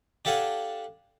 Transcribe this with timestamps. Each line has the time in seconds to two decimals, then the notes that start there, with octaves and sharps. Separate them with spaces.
0.25 D4 G4 A4 F5 F#5 G#5